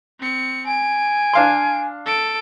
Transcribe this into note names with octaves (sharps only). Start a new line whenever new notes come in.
C4 C#7
G#5 D7
D4 F5 C6
A4 D7